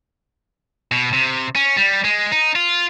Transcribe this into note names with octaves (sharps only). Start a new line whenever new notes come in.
B2
C3
C#4
G3
G#3
D#4
F4